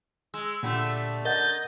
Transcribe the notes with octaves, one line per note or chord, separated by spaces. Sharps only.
G#3 E6
A#2 D3 G3 A3
A#4 D#5 F#5 G6 A6